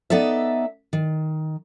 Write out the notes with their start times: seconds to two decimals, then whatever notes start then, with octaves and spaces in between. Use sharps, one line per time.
0.10 B3 D#4 A4 D5 E5
0.93 D#3